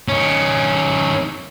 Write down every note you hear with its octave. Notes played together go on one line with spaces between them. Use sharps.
D#3 C#4